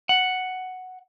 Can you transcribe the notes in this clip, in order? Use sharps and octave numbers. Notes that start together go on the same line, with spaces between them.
F#5